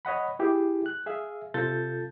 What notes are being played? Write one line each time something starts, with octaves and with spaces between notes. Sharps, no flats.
C#5 D#5 F#5 B5
E4 G4 G#4
F#6
G#4 E5 F5
C3 F4 A4 G6 A6